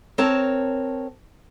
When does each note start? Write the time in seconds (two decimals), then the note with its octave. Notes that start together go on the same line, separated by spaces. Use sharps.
0.18 C4 A#4 C#5 A5